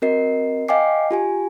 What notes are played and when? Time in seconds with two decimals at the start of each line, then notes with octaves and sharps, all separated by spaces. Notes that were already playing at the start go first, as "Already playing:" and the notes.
0.02 C4 F#4 A#4 D#5 C7
0.68 D#5 F5 G5 G#5 D6 C7
1.11 F4 G4 G#5